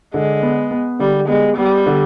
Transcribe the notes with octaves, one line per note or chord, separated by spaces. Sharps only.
D3 G#3
B3
B3
D3 G3
G#3 B3
G3 B3
D3